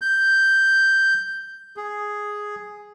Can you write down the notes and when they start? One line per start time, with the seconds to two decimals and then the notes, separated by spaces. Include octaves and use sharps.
0.02 G6
1.77 G#4